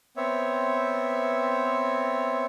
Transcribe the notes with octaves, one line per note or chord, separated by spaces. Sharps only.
B3 C4 C#5 E5